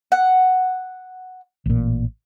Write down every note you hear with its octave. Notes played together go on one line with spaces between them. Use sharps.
F#5
A1 A#2